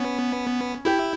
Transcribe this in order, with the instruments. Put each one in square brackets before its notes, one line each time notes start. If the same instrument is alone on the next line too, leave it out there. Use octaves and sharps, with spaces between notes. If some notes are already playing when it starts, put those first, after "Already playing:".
Already playing: [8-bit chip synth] B3 [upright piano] C#4
[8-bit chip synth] E4 [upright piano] G4